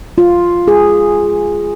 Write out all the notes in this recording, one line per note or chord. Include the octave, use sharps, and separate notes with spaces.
F4
G#4